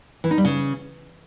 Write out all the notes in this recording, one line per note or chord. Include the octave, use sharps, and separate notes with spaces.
E3
D#4
G3
C#3